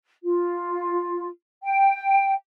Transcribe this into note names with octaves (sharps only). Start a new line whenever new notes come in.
F4
G5